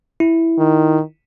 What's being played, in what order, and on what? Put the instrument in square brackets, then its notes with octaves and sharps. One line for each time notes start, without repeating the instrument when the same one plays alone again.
[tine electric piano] E4
[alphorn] D#3